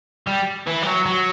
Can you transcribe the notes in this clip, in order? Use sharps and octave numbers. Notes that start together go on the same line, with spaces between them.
G3
E3
G3
F#3
F#3